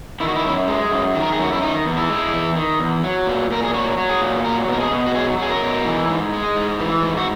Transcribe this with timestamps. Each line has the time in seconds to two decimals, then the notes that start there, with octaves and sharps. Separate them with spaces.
0.20 D#3 E4
0.28 F#4
0.36 E4
0.45 F#2
0.68 G#3
0.91 F#2
1.15 D#3
1.22 A#4
1.33 G#4
1.39 F#2 F#4
1.53 E4
1.61 D#3 D#4
1.85 E2
1.97 E4
2.09 G#3
2.33 E2
2.56 D#3
2.80 E2
3.04 F#3
3.26 A#2
3.50 A#2 A#4
3.63 G#4
3.74 F#3 F#4
3.98 F#3
4.09 G#4
4.21 A#2
4.45 F#3 A#4
4.68 B2 A#4
4.80 G#4
4.91 B2
5.06 F#4
5.15 F#3 G#4
5.38 F#3 G#4
5.50 A#4
5.62 B2
5.85 E3
6.09 G#2
6.33 G#3
6.56 G#2
6.80 E3
7.03 G#2
7.17 F#4